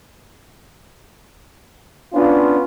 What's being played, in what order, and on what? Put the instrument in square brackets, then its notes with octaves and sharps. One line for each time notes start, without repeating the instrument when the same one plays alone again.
[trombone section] B3 C#4 F4 [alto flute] D4